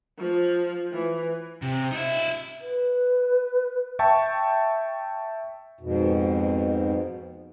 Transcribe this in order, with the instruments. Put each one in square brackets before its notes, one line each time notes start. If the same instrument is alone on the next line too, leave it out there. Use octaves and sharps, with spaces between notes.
[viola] F3
E3
[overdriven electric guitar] C3
D#4 E5
[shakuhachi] B4
[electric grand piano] E5 G5 A5 C#6
[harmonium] F2 G#2 B2